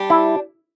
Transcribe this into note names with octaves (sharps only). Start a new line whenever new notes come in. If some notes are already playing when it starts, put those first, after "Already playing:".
Already playing: G3 D4 G4
E4